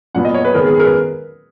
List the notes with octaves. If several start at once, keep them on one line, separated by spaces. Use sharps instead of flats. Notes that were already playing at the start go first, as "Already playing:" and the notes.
A#2 F#3 B3 F#5
D#5
C#5
B4
D#3 G#3 B3 A#4
G#4
G#4
A#4
B4